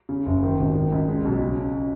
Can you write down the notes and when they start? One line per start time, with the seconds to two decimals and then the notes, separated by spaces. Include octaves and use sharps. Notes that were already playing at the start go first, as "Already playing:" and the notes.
0.09 C#3
0.26 F#1
0.42 D#3
0.59 G#1
0.75 D#3
0.92 C#2
1.08 G#3
1.25 B1
1.40 C#3